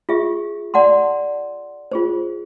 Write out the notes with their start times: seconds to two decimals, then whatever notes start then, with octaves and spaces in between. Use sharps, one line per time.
0.09 F4 G4 G#4 E5
0.74 D5 F#5 A5 C6
1.92 F4 G#4 C5